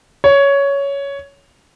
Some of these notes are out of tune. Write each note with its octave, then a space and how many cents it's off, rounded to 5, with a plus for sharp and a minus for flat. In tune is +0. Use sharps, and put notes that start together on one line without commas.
C#5 +10